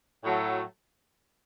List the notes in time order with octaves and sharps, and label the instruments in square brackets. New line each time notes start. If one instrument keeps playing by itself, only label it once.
[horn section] A2 F#3 A3